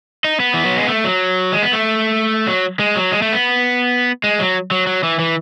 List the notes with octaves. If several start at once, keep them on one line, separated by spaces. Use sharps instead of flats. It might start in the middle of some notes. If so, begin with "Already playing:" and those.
D#4
B3
E3
F#3
G#3
A3
F#3
G#3
B3
A3
F#3
G#3
F#3
G#3
A3
B3
G#3
F#3
F#3
F#3
E3
E3